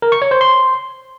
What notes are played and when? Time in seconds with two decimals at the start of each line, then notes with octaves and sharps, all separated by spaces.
0.02 A#4
0.12 C#6
0.22 C#5
0.31 C5
0.41 C6